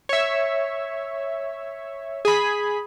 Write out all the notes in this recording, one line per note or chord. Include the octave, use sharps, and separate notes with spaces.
C#5 E5
G#4 B5